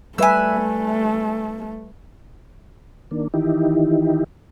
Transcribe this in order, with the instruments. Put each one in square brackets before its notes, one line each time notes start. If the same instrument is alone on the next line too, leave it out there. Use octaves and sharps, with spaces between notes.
[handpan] G3 B4 E5 [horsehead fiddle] A3 [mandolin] G#5 E6
[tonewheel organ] D#3 A#3 D4
D#3 E3 D#4 E4 G4